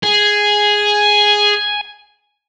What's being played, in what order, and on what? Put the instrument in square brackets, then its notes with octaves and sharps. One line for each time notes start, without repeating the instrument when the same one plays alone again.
[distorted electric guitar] G#4 [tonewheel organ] G#5